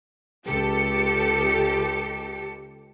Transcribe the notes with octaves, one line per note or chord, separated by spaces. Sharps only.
C#2 G4 A4 C#7